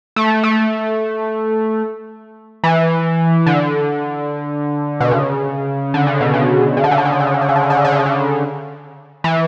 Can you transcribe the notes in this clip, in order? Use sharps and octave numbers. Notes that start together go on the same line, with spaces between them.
A3
A3
E3
D3
B2
C#3
D3
C#3
B2
C#3
C#3
D3
C#3
D3
C#3
D3
C#3
D3
C#3
D3
C#3
D3
C#3
D3
C#3
D3
C#3
D3
C#3
E3